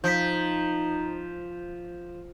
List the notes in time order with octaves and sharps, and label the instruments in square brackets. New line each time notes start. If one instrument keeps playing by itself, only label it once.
[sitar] F3 [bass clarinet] D#4 [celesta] G6 B6